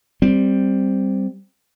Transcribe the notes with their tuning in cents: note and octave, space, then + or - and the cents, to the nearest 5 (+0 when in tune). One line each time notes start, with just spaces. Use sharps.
G3 +0 C4 +0